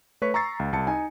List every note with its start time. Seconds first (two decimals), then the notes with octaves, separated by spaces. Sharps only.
0.22 A3 B4 C#5 C#6 B6
0.34 A#5 C#6 E6 A6 C7
0.60 C#2
0.73 C2 A5 C#7
0.87 D#4 G#5